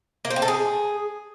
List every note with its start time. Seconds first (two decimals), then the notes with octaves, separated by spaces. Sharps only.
0.25 A#3
0.30 C5
0.36 C4
0.42 A4
0.48 G#4